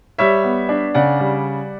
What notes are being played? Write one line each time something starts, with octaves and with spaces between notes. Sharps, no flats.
G3 C#5 E5
B3
D4
C#3 D5 F#5
G3